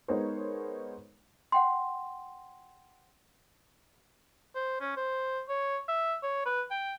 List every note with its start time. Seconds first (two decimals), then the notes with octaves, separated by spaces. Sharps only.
0.08 G#3 B3 D#4 A#4 C5 C#5
1.52 F#5 G5 C6
4.55 C5
4.81 C#4
4.97 C5
5.49 C#5
5.88 E5
6.23 C#5
6.46 B4
6.71 G5